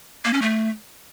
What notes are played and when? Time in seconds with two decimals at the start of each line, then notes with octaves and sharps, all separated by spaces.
0.25 A#3
0.33 C#4
0.42 A3